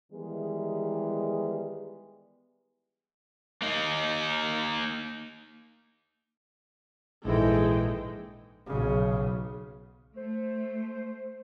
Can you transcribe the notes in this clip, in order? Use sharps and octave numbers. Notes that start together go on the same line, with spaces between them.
D#3 E3 G3 G#3 B3 G#4
A#3 D#4
A#1 G#2 E3 G#3 E4 A4 D#5 G5
B1 C#3
A3 C5